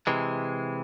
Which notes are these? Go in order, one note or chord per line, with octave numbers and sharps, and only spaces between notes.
C3 E3 G#3